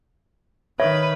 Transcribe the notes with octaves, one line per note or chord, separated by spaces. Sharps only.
D#3 B4 C#5 E5